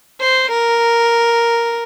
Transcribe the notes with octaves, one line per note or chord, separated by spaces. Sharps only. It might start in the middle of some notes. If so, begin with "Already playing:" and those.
C5
A#4